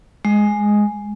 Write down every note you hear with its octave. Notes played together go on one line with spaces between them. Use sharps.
G#3